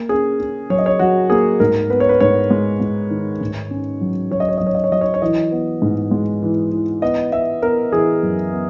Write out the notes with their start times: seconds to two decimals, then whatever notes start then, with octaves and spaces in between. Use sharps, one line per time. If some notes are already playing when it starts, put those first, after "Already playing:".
Already playing: A#3 A#4
0.09 C#4 G#4
0.40 C#4
0.70 F#3 C#5
0.78 D#5
0.86 C#5
0.99 F#3 F#4
1.30 A#3 G#4
1.60 G#2 A#4
1.90 B3 B4
2.00 C#5
2.09 B4
2.20 G#2 C#5
2.50 G#3
2.80 G#3
3.10 D#3
3.41 G#2
3.71 C#4
4.01 F#3
4.31 F#3 C#5
4.40 D#5
4.49 C#5
4.58 F#3 D#5
4.67 C#5
4.75 D#5
4.84 C#5
4.92 F#3 D#5
5.01 C#5
5.14 C#5
5.22 E3 D#5
5.52 B3
5.82 G#2
6.11 G#3
6.42 E3
6.72 E3
7.02 B3 D#5
7.32 B3 E5
7.62 B3 A#4
7.92 E3 G#4
8.23 F#2
8.52 B3